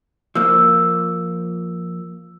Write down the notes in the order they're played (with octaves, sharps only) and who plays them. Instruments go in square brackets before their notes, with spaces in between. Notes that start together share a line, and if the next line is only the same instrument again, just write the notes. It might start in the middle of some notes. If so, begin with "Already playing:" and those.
[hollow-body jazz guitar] F3 A#3 [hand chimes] E6